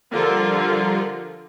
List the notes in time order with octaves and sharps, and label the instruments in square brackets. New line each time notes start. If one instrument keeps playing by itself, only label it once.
[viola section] D3 F4 [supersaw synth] F3 G3 A#4